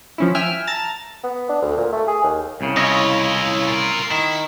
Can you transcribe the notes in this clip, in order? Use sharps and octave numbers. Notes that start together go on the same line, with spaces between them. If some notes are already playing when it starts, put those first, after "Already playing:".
F3 C#4 E4
E5 G5 G#5 E6 F6
A5 A#5 A6
B3
D4
D2
A#2
A3
G#4
D#2
C2 C#3
C#4 E4 F4 C#5 D#5
F4 A#4
D#3 E4